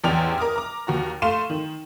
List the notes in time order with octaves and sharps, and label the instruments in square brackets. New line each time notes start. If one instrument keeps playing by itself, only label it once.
[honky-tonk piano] A1 E2 D5 G5 F6 F7
A#4 D6 D#6 F6
A#5 D6
D#2 F#4 A#5
A3 F5 C6 D#7 E7
D#3